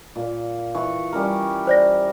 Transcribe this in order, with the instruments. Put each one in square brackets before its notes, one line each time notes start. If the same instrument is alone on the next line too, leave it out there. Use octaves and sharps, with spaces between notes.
[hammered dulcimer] A#2
E3 C#6
G3 C#4 A#4
[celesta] C5 D5 A#6